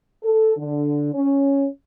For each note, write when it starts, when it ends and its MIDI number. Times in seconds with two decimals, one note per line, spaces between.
0.23 0.53 69
0.57 1.11 50
1.13 1.66 61